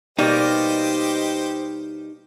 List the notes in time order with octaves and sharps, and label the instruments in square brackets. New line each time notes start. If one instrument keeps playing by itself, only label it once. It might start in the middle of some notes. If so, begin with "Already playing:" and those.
[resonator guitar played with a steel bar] B2 G3 A#3 [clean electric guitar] D#4 [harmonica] G4 C5 D#5